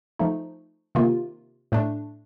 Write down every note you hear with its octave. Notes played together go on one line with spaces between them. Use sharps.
F3 A3 D#4
C3 D#3 A#3 F4
A2 A3 D4